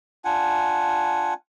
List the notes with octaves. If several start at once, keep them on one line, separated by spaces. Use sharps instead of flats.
D4 F4 F#5 G#5